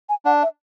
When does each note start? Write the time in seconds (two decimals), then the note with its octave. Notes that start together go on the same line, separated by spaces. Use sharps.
0.09 G#5
0.25 D4 F#5
0.43 E5